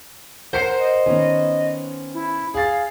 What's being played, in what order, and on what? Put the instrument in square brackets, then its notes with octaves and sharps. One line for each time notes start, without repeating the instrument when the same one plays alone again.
[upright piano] A#4 [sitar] C5 [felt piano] F#5 C7 C#7
[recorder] D#5
[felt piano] D#3 B3 [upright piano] C#4
[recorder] E4
[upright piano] G#4 A6 [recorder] F5